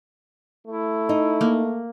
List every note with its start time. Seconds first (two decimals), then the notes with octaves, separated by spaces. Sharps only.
0.67 A3 E4
1.09 D#4
1.41 A#3